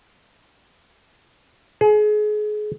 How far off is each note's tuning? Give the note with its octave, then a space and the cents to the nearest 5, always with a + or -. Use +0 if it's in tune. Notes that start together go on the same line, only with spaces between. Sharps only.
G#4 +30